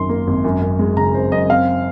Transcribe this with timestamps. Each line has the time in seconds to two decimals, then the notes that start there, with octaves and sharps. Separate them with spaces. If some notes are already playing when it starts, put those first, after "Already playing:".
Already playing: G#1 F#2 D#3 C6
0.09 A#3
0.27 G#1
0.44 F#2
0.62 F#2
0.79 G#3
0.97 C#3 A#5
1.15 F#2 C5
1.32 F#2 D#5
1.50 C4 F5